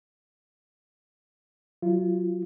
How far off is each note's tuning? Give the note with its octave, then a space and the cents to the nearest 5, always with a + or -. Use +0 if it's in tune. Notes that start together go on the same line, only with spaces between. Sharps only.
F#3 +0 F4 -25